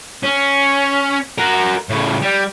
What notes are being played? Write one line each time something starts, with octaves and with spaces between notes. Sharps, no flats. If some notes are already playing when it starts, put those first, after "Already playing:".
C#4
F#4 A#4
A2 C#3
G3